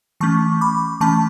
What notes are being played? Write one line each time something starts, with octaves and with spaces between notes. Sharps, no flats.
E3 A3 C#4 A5 C#6
B5 D6
E3 A3 C#4 A5 C#6